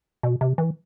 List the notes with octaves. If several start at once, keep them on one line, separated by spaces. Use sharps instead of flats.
B2
C3
E3